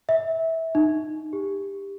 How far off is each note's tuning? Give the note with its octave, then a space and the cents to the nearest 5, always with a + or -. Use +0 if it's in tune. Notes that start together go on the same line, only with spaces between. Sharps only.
E5 -20
D#4 -20
G4 +15